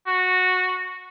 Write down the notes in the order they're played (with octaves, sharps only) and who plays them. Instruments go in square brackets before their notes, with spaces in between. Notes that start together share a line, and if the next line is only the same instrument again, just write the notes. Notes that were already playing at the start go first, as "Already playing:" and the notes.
[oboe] F#4